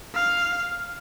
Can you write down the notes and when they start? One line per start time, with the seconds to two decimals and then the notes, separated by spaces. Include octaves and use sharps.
0.15 F5